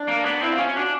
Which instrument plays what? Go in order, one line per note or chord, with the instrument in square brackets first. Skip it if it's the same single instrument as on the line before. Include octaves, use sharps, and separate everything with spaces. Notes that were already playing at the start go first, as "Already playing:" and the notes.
Already playing: [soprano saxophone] D4
[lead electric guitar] A#3
B3
[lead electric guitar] C4 [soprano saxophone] E4
[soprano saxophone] F4
[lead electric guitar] C#4
[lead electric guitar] D4 [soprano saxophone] F#4